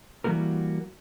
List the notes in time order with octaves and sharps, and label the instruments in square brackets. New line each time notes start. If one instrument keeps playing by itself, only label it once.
[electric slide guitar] E3 G3 A#3 F#4 A#4